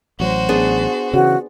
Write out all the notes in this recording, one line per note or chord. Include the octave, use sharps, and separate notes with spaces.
A1 F#3 F#4 C5
B3 D4 G#4
C#3 E3 F#4